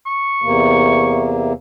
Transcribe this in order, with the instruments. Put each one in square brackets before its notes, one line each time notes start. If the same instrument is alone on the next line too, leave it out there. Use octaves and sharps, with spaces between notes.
[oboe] C#6
[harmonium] E2 C3 A#3